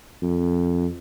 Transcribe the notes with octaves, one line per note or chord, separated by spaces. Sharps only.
F2